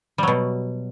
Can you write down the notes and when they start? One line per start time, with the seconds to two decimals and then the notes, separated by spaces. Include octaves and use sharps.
0.18 G3
0.23 F#3
0.28 B2